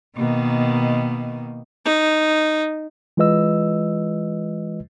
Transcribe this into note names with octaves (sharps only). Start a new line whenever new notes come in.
B2 D#3 A#3
D#4
E3 G#3 F4 B4 D#5 E6